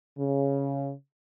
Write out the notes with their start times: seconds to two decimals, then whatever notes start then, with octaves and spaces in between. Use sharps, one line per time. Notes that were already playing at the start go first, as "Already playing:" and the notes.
0.18 C#3